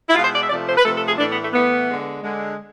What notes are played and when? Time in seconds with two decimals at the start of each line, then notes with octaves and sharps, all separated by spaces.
0.09 E4
0.15 B2 G#3 F4
0.23 C5
0.33 D5
0.41 E5
0.50 C3 F3 A3 D5
0.68 C5
0.77 B4
0.85 C3 F3 A3 A4
0.95 A4
1.07 G#4
1.18 A2 E3 A3 D4
1.30 B3
1.42 A3
1.54 A2 E3 A3 B3
1.88 D3 G#3
2.23 D3 G#3